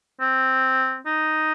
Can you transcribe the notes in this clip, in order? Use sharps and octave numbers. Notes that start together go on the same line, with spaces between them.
C4
D#4